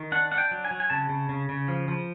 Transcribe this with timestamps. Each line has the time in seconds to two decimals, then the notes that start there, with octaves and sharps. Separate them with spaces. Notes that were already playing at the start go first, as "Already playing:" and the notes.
Already playing: D#3
0.12 D4 F#5
0.32 D4 F#5
0.38 G5
0.51 F#3
0.65 G#5
0.71 F#3
0.80 G#5
0.90 C#3 A5
1.09 C#3
1.29 C#3
1.49 C#3
1.68 F3
1.88 F3